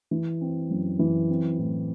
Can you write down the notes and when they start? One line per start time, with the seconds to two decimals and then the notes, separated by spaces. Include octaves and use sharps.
0.11 E3
0.41 C4
0.70 F#2
0.99 E3
1.29 C4
1.58 A2